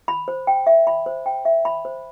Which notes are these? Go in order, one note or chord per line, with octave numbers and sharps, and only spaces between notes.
B5
C5
G5
E5
B5
C5
G5
E5
B5
C5